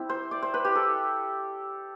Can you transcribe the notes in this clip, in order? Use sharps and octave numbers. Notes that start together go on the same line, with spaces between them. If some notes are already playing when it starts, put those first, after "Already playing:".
Already playing: G3 C4 E4
C5
D5
C5
B4
G4
A4